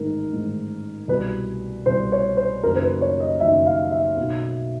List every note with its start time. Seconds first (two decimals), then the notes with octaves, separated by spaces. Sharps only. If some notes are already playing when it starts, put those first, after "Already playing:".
Already playing: A1 G#2 D#3 A#4
0.32 A1 G#2 D#3
1.08 C2 B2 B4
1.85 C2 B2 C5
2.12 C#5
2.37 C5
2.64 F#1 F#2 D#3 A#4
2.76 C5
2.82 B4
3.01 C#5
3.20 D#5
3.40 F#1 F#2 D#3 E5
3.66 F5
3.91 E5
4.17 B1 B2